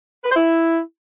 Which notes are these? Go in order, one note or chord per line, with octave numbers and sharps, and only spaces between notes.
B4
C5
E4